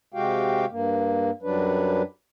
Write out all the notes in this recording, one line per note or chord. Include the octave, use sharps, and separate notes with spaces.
C3 G#3 F#4 G4 F5 G5
G2 A#3
F#2 F#3 G3 D4 B4